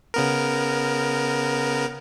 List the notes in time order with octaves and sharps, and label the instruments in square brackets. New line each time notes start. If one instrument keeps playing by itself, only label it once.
[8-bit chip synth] C#3 B3 A#4